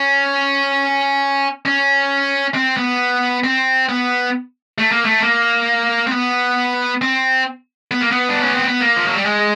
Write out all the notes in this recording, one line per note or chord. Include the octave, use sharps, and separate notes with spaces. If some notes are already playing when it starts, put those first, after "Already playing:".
Already playing: C#4
C#4
C4
B3
C4
B3
A3
A#3
A3
A#3
C4
B3
C4
B3
A#3
B3
D4
C#4
C4
B3
A#3
F3
F#3
G3
G#3